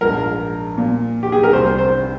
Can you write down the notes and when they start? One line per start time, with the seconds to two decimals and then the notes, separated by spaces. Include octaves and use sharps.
0.01 A#1 G#2 F3 A#4
0.77 A#2 F3 A#3
1.23 G4
1.32 G#4
1.43 A#4
1.53 C2 C3 G3 C4 C5
1.78 C5